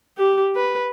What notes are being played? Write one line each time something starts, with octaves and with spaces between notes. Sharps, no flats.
G4
B4